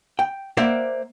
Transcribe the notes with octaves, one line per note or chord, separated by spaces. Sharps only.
G5
A#3 C5 D5 E5 F#5